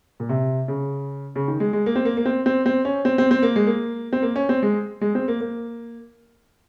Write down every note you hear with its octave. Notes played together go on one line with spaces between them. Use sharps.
A#2
C3
C#3
C#3
D#3
G#3
G#3
A#3
C4
A#3
A#3
C4
C4
C4
C#4
C4
C4
C4
A#3
G#3
A#3
C4
A#3
C#4
C4
G#3
G#3
C4
A#3
A#3